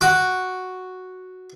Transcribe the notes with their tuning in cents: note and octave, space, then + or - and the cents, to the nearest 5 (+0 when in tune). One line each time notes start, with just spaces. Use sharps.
F#4 +0 D6 +0